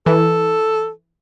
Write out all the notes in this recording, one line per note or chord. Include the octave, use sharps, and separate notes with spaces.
E3 A4